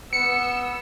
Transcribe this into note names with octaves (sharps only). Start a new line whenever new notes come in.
B3 E6 C#7